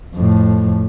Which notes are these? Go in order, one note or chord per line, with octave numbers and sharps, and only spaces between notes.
F2 A2